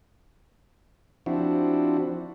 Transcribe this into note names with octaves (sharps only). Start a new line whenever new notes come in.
F3 C4 D4 E4 F#4